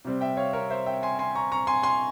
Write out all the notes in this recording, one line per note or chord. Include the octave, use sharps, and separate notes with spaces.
C3 G3 C4
E5 G5
C#5 F5
A#4 C#5
C5 E5
E5 G5
G#5 C6
G#5 C6
A#5 C#6
A#5 C#6
G#5 C6
G#5 C6